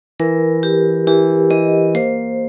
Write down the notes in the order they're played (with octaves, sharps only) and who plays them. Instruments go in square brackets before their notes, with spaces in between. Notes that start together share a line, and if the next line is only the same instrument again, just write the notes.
[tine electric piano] E3 [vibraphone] A#4
[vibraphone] G4
[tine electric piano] E3 [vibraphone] G4
[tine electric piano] E3 [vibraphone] D#5
[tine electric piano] A#3 [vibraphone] C5